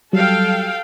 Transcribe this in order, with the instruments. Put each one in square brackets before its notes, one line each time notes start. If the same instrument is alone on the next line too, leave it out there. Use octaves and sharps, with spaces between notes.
[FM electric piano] F#3 G3 [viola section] A4 F5 G5